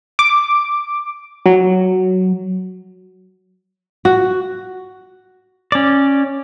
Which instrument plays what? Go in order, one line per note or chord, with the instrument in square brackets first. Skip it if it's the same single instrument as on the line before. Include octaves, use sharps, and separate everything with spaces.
[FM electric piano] D6
F#3
[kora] F#4
[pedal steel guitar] C#4 D5